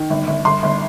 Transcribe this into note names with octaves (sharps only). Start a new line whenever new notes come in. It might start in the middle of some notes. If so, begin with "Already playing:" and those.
Already playing: D#3
G1
G1
G1 C6
G1